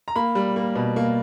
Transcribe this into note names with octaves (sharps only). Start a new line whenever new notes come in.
A#5
A#3 B5
G3
A#3
B2
A#3